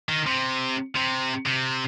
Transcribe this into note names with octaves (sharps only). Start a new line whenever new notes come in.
D#3
C3
C3
C3